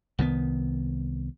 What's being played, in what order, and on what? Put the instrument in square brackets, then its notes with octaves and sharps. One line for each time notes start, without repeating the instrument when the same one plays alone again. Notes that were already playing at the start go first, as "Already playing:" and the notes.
[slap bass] C2 D#3 F#3 B3